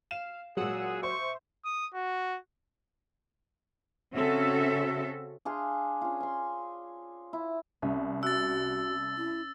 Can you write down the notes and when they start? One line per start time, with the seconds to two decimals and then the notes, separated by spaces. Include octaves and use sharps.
0.11 F5 E7
0.57 A#2 F#3 G#3 G#4 F#5 D#6 E6
1.03 C5 E5 C#6
1.65 D#6
1.94 F#4
4.14 C#3 C4 C#4 F#4 A4 E5
5.45 D4 G#4 F5 C6
6.01 C#4 F4
6.20 G#5 C6
7.33 E4
7.82 C2 C#4
8.23 F#4 E6 F#6 A6
9.17 E4